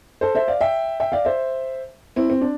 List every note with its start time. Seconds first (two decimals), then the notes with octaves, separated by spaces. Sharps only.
0.21 A4 C5
0.35 C5 E5
0.48 D5 F5
0.61 E5 G5
1.00 E5 G5
1.12 D5 F5
1.25 C5 E5
2.16 C4 E4
2.30 C4
2.41 D4